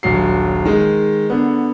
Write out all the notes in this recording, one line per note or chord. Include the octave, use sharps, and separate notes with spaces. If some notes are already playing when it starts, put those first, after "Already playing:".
D#1 A#1 F#3 C7
D#3 G#3
D3 B3